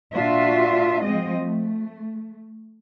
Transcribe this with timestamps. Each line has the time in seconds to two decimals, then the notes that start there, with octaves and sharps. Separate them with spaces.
0.14 A#2 D4 F4 F#4 E5
1.04 F3 G#3 C4 D#5
1.41 A3